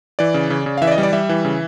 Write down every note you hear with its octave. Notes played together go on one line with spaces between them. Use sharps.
E3 D5
C#3
C#3
C#3
F5
E3 E5
D5
D#5
G3
D5
G3 E5
E3
C#3